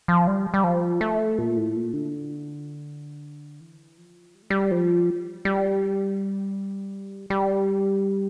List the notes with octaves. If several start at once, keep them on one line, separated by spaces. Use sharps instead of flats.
F3
G3
G3
F3
A3
A#2
A2
A#2
D3
E3
F3
G3
A3
G3
F3
G3
G3